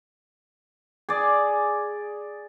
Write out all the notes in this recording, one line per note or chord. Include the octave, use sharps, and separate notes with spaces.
G#4 D5